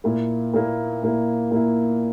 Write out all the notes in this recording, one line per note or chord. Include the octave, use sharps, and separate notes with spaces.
A#2 A#3 E4
A#2 A#3 E4
A#2 A#3 E4
A#2 A#3 E4